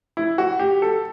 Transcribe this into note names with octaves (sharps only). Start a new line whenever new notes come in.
E4
F#4
G4
A4